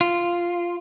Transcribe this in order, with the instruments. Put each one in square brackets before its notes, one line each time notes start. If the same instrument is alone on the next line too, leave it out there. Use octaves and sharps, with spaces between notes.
[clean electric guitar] F4